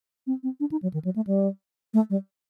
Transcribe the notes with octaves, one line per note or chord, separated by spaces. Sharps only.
C4
C4
D4
D#4
F#3
D#3
F#3
A3
G3
A3
G3